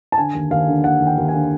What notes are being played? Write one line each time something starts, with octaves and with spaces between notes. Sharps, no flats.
A5
D3 G#5
D#2
D#2 F5
D3
D#2 F#5
D#2
G5
D#2
G#5
D3